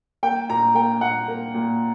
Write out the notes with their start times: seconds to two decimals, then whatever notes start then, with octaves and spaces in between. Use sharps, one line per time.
0.23 A#3 G5
0.49 A#2 A#5
0.75 A#3 G5
1.01 A#2 F#5
1.28 A#3
1.54 A#2